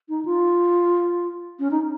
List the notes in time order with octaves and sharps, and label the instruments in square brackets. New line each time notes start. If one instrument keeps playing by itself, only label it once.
[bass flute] D#4
F4
C#4
D#4